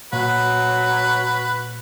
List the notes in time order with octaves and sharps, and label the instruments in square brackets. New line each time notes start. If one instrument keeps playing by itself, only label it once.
[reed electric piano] A#2 [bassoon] F#3 [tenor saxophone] F#4 [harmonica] B4